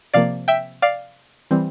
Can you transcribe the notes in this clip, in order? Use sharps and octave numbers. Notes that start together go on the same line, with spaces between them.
C3 F3 A#3 D5 F5
E5 G5
D5 F5
E3 G3 C4